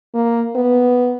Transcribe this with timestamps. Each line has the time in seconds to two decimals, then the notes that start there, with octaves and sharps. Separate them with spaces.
0.15 A#3
0.56 B3